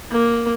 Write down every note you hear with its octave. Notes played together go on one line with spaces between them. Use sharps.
A#3